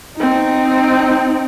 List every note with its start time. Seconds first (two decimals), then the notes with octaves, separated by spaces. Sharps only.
0.17 C4 D#4